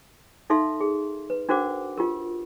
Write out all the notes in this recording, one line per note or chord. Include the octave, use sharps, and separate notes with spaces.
D#4 A4 E5 F5 C6
G#4
B4
D4 F#4 A#4 C5 F#5 D6
F4 G4 A#4